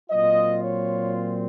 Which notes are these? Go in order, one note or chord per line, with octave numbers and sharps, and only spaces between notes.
A#2 F#3 C4 F4 D#5
C#5